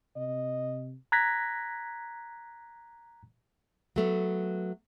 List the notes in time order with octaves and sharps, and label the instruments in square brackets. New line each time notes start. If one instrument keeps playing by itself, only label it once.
[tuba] C3 [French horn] D#5
[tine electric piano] A#5 F#6 G#6 A#6 B6
[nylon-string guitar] F#3 A3 B3